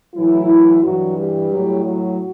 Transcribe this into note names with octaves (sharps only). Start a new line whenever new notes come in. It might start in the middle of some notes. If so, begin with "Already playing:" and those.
A2 E3 F#3 E4
G2 E3 F#3 F#4
G3 G4
A2 F#3
F#3 F#4